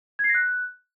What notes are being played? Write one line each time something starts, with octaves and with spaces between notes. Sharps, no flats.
G#6
C7
A#6
F#6